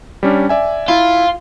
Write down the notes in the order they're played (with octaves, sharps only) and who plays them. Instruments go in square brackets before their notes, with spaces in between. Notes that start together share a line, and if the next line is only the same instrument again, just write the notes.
[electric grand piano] G3 C#4 D4
D5 E5 G#5
[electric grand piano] E4 [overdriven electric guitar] F4